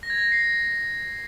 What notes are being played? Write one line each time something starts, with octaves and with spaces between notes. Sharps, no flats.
A#6
G#6
A#6
C7